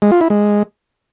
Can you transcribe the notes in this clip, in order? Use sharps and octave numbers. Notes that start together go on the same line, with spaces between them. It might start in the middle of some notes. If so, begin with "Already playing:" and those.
G#3
F4
E4
G#3